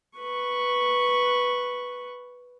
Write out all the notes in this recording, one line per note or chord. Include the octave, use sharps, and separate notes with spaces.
B4 C#6